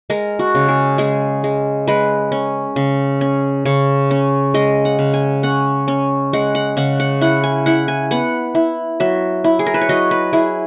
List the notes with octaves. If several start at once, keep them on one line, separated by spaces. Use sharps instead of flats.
G#3 A#4
F#4
C#3
G#4
G#3 G#4
G#3
G#3 B4
C#4
C#3
C#4
C#3 C#5
C#4
G#3 D#5
F#5
C#3
G#5
C#4 F#5
C#4
G#3 F#5
F#5
C#3 F#5
F#5
E4 F#5
G#5
E4 F#5
G#5
B3 F#5
E4
F#3 E5
E4
G#4
A#4
B4
C#5
F#3 D#5
B4
E4 G#4